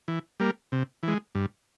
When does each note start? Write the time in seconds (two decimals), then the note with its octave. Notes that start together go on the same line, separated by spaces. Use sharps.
0.08 E3
0.40 G3 A#3
0.72 C3
1.03 E3
1.08 G#3
1.35 G2